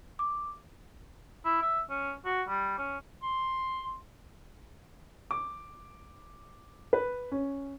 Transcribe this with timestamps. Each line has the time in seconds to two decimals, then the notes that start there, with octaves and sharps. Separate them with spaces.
0.19 D6
1.45 E4
1.62 E5
1.89 C#4
2.25 F#4
2.48 G3
2.78 C#4
3.22 C6
5.31 D6
6.93 B4
7.32 C#4